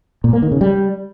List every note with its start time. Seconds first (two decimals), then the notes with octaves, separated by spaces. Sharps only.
0.24 A#2
0.33 A#3
0.42 D#3
0.52 C#3
0.61 G3